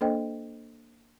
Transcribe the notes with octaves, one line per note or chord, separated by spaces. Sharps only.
A#3 D4 A4 C5 D#5 G5